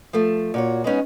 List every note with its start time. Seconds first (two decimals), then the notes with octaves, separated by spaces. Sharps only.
0.13 F3 A3
0.54 A#2 F#4 C#5
0.84 G#3 B3 C#4 D#4